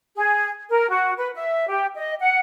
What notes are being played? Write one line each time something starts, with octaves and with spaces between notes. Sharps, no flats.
G#4
A#4
F#4
B4
E5
G4
D#5
F#5